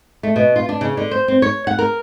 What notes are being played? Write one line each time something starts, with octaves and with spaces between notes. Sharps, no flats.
A3
B2
F4
D4
C#3
D3
C5
C4
C#5
F#5
A#4